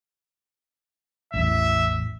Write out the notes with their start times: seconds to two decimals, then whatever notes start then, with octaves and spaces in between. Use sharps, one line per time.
1.34 A1 E2 E5